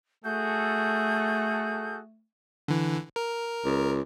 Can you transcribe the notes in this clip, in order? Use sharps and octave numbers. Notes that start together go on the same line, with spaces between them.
A3 F#4 G#4 A4 G6
D3 E3
A#4
C#2